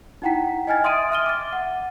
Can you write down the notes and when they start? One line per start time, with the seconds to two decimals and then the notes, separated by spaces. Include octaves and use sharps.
0.22 D#4 E4 F#5 G5 A#5 B6
0.67 D#5 G5 G#5 F6 G#6 A6
0.84 E5 C6 D#6 A6 D7 D#7
1.11 E5 F6 D#7 G7
1.26 D6 A6
1.53 F#5